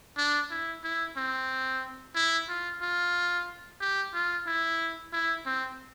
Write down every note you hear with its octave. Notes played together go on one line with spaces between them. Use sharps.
D4
E4
E4
C4
E4
F4
F4
G4
F4
E4
E4
C4